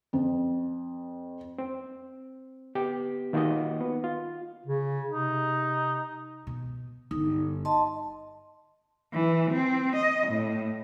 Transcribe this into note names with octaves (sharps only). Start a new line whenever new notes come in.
F2
C4
B3 G4
D#3 A#3 D#4 F4 F#4 D#5
B3
F4
C#3
C3 D#4
B2
G1 D#4
D#5 A5 C6
E3
C4
D#5
A2